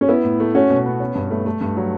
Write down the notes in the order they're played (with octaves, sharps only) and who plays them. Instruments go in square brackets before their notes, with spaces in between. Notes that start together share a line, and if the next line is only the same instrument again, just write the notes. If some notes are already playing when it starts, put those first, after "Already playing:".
[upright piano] C#4
[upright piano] B3 [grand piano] E4
[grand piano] A2
A3
[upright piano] C#4 [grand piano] F#4
[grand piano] B2
B3
C#4
G2
A3
A3
G2
F#3